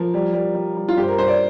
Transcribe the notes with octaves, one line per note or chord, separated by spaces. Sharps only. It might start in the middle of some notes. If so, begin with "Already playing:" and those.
Already playing: F3 A#4
G3
G3
G3
G3
F4
G2 G4
C5
A#4
G2 C5
D5